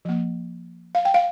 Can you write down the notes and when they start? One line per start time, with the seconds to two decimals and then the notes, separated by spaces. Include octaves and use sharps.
0.05 F3 A#3
0.95 F5
1.05 G5
1.14 F5